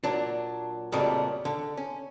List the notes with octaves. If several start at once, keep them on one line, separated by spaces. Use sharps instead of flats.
A#2 F#3 D4
F2 A#2 C#3 F#3 G3 A3
D3
C#4